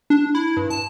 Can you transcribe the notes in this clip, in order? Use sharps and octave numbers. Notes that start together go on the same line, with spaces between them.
D4
E4
G2
A5